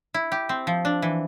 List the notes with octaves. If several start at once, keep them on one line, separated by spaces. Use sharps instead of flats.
E4
G4
C4
F3
D4
E3